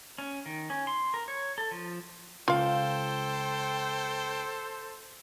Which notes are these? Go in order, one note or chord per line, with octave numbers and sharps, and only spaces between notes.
C#4
D#3
C#4
C6
A#4
C#5
A4
F3
C#2 F4 A4 C5 F5 G5